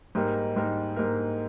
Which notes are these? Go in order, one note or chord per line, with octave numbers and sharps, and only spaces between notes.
G#2 G3 A#3 D#4 A#4
G#2 G3 A#3 D#4 A#4
G#2 G3 A#3 D#4 A#4